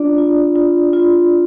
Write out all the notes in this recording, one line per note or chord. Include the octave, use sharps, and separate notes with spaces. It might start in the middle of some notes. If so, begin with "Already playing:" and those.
Already playing: D4 F4 D5
F4
F4
F4